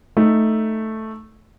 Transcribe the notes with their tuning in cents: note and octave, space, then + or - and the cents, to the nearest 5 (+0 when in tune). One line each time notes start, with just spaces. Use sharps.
A3 +0 D#4 +0